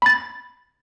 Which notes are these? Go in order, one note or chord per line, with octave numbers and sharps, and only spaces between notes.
B5 A6